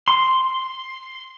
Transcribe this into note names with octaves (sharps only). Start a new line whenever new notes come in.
C6